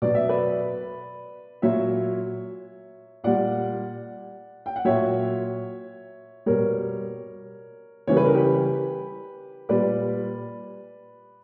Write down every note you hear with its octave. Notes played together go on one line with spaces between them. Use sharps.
B2 F#3 D5
E5
B4 D5
A#2 F#3 C#5 E5
A#2 G3 D5 F#5
G5
F#5
A#2 F#3 C#5 E5
B2 G3 A#4 C#5
C#3 E3 G3 C#5
B4
A#4
G4 B4
A#2 G3 B4 D5